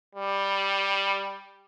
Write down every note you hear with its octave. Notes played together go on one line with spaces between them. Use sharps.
G3